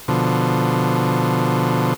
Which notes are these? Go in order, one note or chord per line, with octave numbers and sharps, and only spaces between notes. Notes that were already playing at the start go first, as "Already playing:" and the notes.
B2 D3 F3